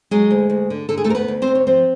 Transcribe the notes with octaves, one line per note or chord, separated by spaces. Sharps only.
F#3 G#3 G#4
D2
D2
D3
D3 A4
G#4
A3 A4
D2 A#4
B3 B4
D2
C4 C5
D2
C#5
F3 C4 C5